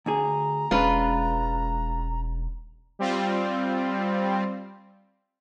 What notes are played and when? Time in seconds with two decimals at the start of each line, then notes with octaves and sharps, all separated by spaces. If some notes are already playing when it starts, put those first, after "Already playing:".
0.06 D2 D3 G#4 A#5
0.71 E1 G#3 C#4 D4 F4 B4
2.99 G3 C4 F4